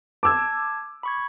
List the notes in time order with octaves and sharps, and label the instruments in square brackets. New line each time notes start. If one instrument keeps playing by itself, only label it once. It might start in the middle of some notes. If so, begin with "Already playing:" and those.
[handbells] A5 G#6 [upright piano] D6 E6
[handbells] B5 C#6 G#6